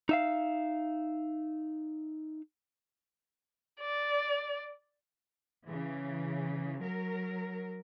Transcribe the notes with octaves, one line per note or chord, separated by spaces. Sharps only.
D#4 E5 F5
D5
C#3 E3
F#3 A#4